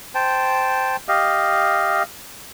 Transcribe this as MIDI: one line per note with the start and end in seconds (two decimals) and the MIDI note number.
0.15 0.96 72
0.15 0.96 79
0.15 0.96 81
1.08 2.03 67
1.08 2.03 75
1.08 2.03 77